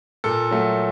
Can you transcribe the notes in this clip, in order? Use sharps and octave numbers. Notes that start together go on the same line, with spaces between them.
A#2 A4
F#3 A3